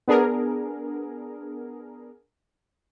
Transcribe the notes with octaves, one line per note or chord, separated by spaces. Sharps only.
B3 D4 G#4 A#4